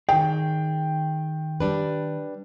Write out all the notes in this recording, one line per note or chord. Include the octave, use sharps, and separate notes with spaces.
D#3 G#4 G5
G3 D4 B4